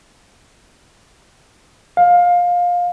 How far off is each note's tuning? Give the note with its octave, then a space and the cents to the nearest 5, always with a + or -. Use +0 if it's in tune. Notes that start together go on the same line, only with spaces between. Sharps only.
F5 +20